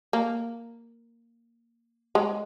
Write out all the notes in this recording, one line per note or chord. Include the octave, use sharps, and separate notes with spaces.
A#3
G#3